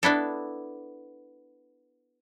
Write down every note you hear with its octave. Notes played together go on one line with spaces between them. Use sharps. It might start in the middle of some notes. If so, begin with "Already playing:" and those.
B3 D4 E4 A4